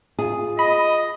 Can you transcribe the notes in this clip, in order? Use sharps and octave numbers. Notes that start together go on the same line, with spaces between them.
F4 G#4
D#5 B5